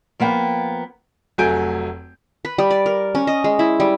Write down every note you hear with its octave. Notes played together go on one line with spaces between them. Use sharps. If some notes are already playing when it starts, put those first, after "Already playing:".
F3 A#3 B3 F#5 G5
F1 F#3 A3 G#5 G6 D7
B4
G3
D5
A#4
C#4
D#5
G#3
E4
G3